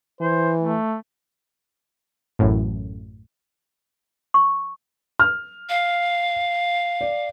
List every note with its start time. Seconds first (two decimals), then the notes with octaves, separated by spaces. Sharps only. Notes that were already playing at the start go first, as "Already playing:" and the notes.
0.21 E3 C5
0.59 A3
2.39 A1 F#2 A2
4.34 C#6
5.19 F6
5.69 F5
7.01 D5